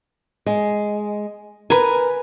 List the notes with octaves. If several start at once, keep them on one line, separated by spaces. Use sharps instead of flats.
G#3
A#4 B4 G#5